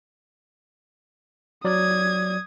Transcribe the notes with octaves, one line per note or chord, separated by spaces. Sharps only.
F#3 D5 D#6 G#6